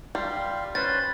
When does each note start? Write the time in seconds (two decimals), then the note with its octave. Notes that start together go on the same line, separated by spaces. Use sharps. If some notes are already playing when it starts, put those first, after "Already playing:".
0.15 G3 F4 G4 C6
0.75 C#4 G4 B4 C5 A6